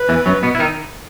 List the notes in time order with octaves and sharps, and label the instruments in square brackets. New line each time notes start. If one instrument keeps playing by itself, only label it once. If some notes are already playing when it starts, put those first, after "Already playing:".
Already playing: [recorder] B4
[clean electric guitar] E2 E3
F#2 F#3
B2 B3
E4
D#3 D#4